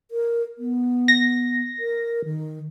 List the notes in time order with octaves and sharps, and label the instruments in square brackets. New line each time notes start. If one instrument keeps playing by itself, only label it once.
[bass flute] A#4
B3
[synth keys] A#6
[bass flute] A#4
D#3